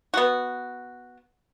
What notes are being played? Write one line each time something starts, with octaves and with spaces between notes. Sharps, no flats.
B3 F#4